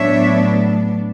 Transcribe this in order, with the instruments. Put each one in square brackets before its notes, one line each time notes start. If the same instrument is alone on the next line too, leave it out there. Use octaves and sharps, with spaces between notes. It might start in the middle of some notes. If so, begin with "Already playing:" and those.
Already playing: [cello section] A2 F#3 B3 D4 C#5 E5